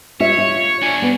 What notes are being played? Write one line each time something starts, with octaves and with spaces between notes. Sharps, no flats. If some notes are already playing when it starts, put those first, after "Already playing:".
F4 C#5 E5
F4
D4 G#5
B3